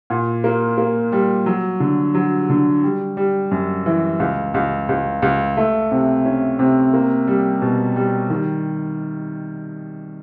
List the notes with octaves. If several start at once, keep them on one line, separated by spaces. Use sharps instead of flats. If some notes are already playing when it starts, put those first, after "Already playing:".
A#2
A#3
A#3
G3
F#3
D3
F#3
D3
G3
G3
F#2
E3
C#2
C#2
C#2
C#2
A3
C3
C#4
C3
A#3
G3
B2
G3
D#3